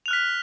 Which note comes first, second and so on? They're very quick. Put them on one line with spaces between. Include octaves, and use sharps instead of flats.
F7 F#6 F6 B6